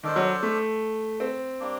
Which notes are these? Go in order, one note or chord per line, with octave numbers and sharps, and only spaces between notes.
D#3 D4 A4 C5
F#3
A3
C4
G3 A#3 D4